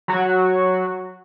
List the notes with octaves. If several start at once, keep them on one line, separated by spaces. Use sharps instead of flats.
F#3 F#4